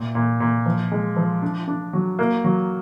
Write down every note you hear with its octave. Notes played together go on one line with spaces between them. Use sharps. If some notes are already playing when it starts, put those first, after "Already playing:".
Already playing: A#2
A#2
A#2
F3
G#3
F3
D4
D4
F#3
A#3
F#3